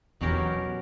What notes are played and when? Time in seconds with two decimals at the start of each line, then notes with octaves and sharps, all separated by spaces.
0.21 E2 B2 F#3 C#4 G4 A#4